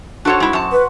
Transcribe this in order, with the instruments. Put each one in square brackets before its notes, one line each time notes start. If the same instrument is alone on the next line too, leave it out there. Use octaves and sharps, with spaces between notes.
[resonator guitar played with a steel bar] D4 A4 C#5 [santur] F#4 C5 F#5
[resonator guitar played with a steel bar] G#3 E4
F#2 A5
[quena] B4